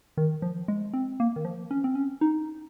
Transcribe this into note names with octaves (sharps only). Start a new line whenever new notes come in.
D#3
F3
G#3
C4
A#3
D#3
F3
C#4
C4
C#4
D#4